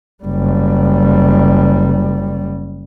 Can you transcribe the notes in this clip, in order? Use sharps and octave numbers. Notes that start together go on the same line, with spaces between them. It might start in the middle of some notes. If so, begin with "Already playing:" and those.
F#1 G3